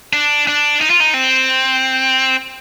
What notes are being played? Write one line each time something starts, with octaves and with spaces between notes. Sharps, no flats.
D4
D4
D#4
F4
D#4
C4